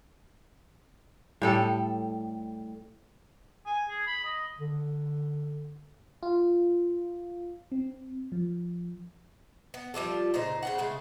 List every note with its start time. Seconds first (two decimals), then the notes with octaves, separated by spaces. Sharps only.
1.42 A2 G3 A4
3.66 G#5
3.89 G#4
4.07 B5
4.24 D#5
4.58 D3
6.23 F4
7.72 C4
8.32 F3
9.74 B3
9.94 F3 G3 F4 A4
10.34 A#2 C#3 D#4 C5
10.63 C#3 C5 F#5
10.78 C#3 G#3 A3